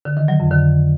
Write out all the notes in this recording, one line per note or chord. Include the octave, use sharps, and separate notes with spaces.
D3
D#3
F#3
F2
D3